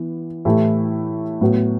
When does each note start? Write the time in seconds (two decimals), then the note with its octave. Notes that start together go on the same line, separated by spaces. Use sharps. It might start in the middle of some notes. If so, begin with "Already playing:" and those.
Already playing: E3 B3
0.45 A2 E3 A3 E4 G4
1.41 A2 F#3 B3